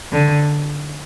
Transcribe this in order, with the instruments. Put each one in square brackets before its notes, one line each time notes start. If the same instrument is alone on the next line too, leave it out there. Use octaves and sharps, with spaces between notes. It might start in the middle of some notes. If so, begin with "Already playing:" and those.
[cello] D3